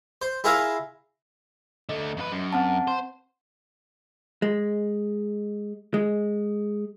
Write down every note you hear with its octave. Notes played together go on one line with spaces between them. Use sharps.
C5
E4 F4 G#4 A#4 E5 F5
D3 A3 D#5
F2 B4
F#2
C4 F#5 A5
C5
G#3
G#3